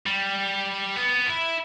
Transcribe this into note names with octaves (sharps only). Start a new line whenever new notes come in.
G3
B3
E4